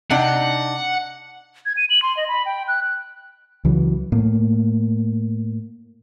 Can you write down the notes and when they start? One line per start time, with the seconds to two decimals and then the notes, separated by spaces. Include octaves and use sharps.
0.11 C3 D4 D#4 F#5
1.66 G#6
1.77 D#7
1.90 F#7
2.02 C6
2.17 D#5
2.28 B5
2.46 G5
2.68 F#6
3.65 C#2 E3 F#3
4.12 A2 A#3